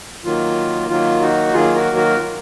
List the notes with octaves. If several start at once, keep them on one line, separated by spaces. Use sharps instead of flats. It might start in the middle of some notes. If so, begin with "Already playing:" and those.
D#3 F#3 A#3 F4
D#3 F#3 A#3 F4
D#4 F#4
D#3 F#3 A#3 F4 G#4
F#4 A#4
F#4 A#4
D#3 F#3 A#3 F4